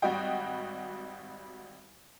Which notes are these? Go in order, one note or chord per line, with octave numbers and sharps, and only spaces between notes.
G#1 G3 F#4 D#5 G5